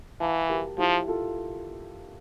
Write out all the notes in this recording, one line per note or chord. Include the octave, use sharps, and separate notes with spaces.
E3 F5 A5
G4 A#4
F3 E4 G4
F4 A4